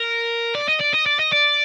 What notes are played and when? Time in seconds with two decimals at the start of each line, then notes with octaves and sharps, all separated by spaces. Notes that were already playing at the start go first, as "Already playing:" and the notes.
Already playing: A#4
0.55 D5
0.68 D#5
0.80 D5
0.93 D#5
1.06 D5
1.20 D#5
1.33 D5